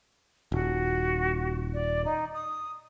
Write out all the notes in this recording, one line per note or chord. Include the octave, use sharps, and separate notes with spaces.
D#1 F#4
D5
D#4
D#6